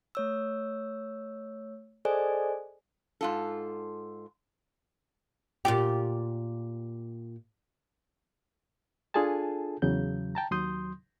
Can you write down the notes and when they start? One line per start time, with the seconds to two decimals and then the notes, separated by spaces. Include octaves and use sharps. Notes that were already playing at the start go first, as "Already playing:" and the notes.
0.15 A3 C#5 E6
2.05 G#4 A4 C5 D5 D#5 G#5
3.21 G#2 F4 A4
5.65 A#2 F4 G4
9.14 D4 F4 G#4 A4 G#5 A5
9.82 E2 C#3 F#3 G6
10.35 G5 A5 A#5
10.51 D#2 F#3 C6 D#6 G6